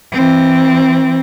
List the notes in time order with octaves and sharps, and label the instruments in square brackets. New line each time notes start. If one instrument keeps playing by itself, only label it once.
[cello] E3 C4